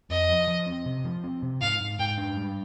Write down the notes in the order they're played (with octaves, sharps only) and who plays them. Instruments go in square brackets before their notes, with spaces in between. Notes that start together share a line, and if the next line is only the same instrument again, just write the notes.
[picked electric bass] F2 [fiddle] D#5
[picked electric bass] F3
F3
C4
C3
F3
C4
C3
[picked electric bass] G#2 [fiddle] F5
[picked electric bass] G#2
[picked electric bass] G#2 [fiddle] G5
[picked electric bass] D4
G3